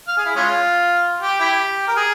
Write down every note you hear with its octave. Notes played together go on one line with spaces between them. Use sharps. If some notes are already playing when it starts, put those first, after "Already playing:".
F5
G#4
E4
G#3 C#4 F4
G4
E4 G4
A#4
G#4